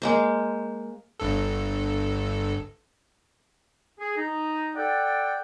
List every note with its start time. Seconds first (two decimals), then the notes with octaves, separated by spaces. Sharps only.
0.02 G#3 A#3 C5
1.20 G1 G2 A4
3.99 G#4
4.17 D#4
4.75 A4 D5 F#5 G5